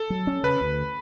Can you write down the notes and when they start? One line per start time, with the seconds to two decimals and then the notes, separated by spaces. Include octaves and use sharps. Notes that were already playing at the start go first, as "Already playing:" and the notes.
Already playing: A4
0.10 F#3
0.27 C#4
0.43 C#3 B4
0.61 D2